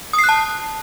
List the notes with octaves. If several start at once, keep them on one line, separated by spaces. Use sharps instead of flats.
D#6
C7
F#6
A5